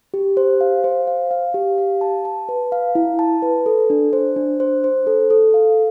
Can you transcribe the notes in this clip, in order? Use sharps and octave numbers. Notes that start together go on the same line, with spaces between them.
G4
C5
F5
C5
F5
F5
G4
F5
A5
A5
B4
F5
E4
A5
B4
A4
D4
C5
D4
C5
C5
A4
A4
F5